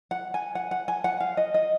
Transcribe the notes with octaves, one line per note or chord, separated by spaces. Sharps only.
F#5
G#5
F#5
F#5
G#5
F#5
F5
D#5
D#5